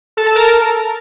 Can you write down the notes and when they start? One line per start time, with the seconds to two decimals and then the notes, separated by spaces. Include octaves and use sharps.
0.17 A4
0.26 A5
0.35 A#4